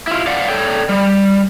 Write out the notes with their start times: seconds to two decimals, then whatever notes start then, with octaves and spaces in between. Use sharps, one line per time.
0.07 E4 F4
0.27 D5 F5 F#5
0.49 A4 C#5 D5 G5
0.89 G3